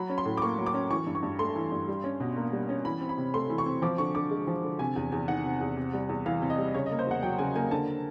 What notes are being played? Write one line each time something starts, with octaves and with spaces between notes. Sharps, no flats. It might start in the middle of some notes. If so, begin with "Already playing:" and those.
Already playing: F#3 B5
C#4
C6
A2
D6
A#3 C#6
F#3
D6
C#4
E3 C#6
G2
C#6
G2
A3 C6
E3
G2
G3
C#4
B2
A#3
G3
C#4
E3 B5
C4
B5
C3
A3 C6
E3
C#6
C4
F3 D6
D3 C#6
D3 D6
G#3
F3
D3
C3 G#5
E2
E2
D#3 F#5
C3
E2
C3
G3
E2
E3 F5
C3
D#5
G3
C#3 C#5
D#5
A#3
C5
E2 F#5
F#3 G5
C#3 G#5
A#3 G#5
D3 A5